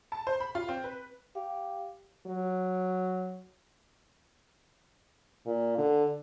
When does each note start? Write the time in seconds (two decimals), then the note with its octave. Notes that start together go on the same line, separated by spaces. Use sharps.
0.12 A5
0.27 C5
0.40 B5
0.55 F4
0.68 C4
0.84 B4
1.35 G4 F5
2.26 F#3
5.46 A#2
5.78 D3